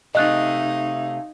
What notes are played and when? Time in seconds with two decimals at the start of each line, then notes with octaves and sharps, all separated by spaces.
0.15 C3 A3 D#4 G#4 D#5 F5 F#6 A6